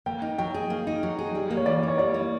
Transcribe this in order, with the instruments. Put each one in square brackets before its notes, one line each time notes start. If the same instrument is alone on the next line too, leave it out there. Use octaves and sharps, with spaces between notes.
[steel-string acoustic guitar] A#3 [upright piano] G5
[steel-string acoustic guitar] D#4
[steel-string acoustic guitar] F#3 [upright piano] G5
[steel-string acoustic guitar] G#4
A#3
D#4
F#3
G#4
G3
A#3
[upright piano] C#5
[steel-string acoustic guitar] E3 [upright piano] D5
[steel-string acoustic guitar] D#4 [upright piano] C#5
[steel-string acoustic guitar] G3 [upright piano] D5
[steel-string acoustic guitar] A#3